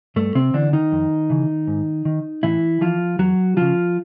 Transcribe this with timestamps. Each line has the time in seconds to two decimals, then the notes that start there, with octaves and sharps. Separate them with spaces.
0.16 G2 A3
0.35 C3 C4
0.54 D3 E3 D4
0.73 D#3 D#4
0.92 F2
1.30 C#3 E3
1.67 G#2
2.05 D#3
2.43 A2 E3 E4
2.81 E3 F3 F4
3.19 E2 F#3 F#4
3.57 C#3 E3 F3 F4